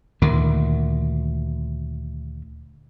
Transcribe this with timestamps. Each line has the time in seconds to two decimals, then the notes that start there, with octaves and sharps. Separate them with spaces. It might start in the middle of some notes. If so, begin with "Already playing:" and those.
0.22 D2 A#2 D#3